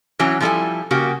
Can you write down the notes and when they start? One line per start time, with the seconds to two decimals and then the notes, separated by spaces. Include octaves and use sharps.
0.19 E3 F#3 C#4 F#4
0.41 F3 G3 A#3 E4 A4 G#5
0.91 C#3 A#3 F#4 G4